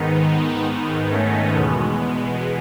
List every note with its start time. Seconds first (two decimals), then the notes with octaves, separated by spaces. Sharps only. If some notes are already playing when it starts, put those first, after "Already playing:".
Already playing: G#2 D#3 B3 D#4
0.67 B3 D#4
1.12 A3 C#4
1.55 E2 B2 G#3 B3